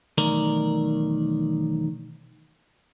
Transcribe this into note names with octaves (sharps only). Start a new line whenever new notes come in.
B1 E2 D#3 A3 A#4 D5